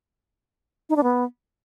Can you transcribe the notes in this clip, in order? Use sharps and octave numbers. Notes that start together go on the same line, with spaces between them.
D#4
D4
B3